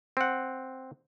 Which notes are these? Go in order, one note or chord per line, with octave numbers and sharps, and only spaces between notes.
C4 F#5